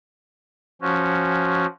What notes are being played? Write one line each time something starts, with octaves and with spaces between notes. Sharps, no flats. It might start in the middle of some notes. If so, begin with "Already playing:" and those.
F3 C#4 F#4